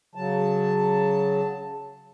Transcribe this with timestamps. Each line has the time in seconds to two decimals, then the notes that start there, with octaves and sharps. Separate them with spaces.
0.15 C#3 F#3 A5